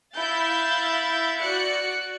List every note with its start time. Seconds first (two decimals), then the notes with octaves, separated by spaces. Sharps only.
0.14 E4 F5 G6 A6
1.39 F#4 D5 F#6 C#7